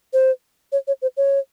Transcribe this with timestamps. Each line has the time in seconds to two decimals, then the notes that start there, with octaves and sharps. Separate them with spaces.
0.13 C5
0.72 C#5
0.88 C#5
1.02 C5
1.17 C#5